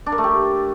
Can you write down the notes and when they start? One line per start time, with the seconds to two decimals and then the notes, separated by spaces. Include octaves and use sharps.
0.06 D4
0.12 A#4
0.18 A3
0.24 G4